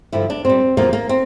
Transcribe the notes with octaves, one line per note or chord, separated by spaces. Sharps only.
G2 D3 F3 E4
D4
A#2 G3 C4
E2 C3 F3 A#3
A#3
C4